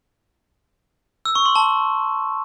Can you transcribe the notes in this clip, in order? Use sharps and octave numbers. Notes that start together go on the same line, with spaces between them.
E6
C#6
C6
A5